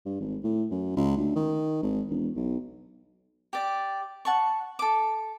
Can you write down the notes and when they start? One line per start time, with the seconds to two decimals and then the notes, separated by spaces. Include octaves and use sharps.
0.05 G2
0.20 G#1
0.43 A2
0.71 F#2
0.96 C#2
1.17 D2
1.36 D#3
1.82 G#1
2.10 E1
2.36 B1
3.53 G4 D5
4.25 F#5 A5 C#6
4.79 A4 D6